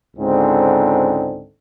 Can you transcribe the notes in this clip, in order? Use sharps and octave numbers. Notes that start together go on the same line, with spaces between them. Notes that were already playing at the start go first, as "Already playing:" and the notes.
C#2 G#2 D3 C4